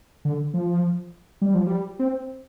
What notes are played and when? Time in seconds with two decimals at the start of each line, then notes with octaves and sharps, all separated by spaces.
0.25 D3
0.54 F3
1.42 G3
1.54 F3
1.67 G3
1.99 C4